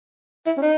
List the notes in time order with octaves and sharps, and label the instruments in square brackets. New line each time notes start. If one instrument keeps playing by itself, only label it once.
[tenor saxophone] E4
C#4
D#4